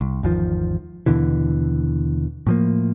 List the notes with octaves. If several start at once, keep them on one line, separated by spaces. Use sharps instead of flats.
C2
G#1 E2 D#3 F3
D#2 B2 D3 E3
A2 F3 A#3